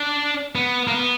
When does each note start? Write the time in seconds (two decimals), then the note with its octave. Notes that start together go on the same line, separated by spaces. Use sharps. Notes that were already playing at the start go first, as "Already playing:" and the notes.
Already playing: D4
0.55 B3
0.87 A#3
0.92 B3